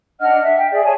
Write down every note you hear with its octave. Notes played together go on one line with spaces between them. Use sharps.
D4 D#5 F#5 F6
E5
G5
G#4 D5 E5
G#4 C#5 G#5 A5